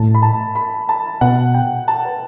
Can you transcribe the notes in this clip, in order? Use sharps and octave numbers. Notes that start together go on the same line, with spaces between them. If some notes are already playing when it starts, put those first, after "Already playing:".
Already playing: A2 A5
B5
A5
B5
A5
B2 F#5
G5
A5
B4